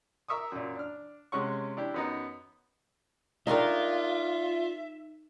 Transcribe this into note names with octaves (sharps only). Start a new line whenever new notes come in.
A#4 E5 C#6 D#6
F#2 A#2
D4 F6
C3 G#3 C#4 F#5 C#6
D4 E4 G4
F#2 B3 D#4
D#3 A3 D4 D#4 F4 A#4 E5